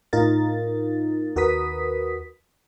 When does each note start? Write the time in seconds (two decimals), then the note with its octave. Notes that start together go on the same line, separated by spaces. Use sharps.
0.13 A2 D#4 F4 A#4 A6
1.36 D#2 F#4 A#4 B4 D#6 B6